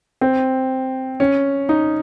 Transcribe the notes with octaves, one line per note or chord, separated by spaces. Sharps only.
C4
C#4
D#4